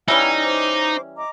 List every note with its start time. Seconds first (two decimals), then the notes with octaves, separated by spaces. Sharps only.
0.08 E3 G3 C#4 D#4 C#5 F#5 G5
0.42 C5 D6
1.18 D#5 A#5 D6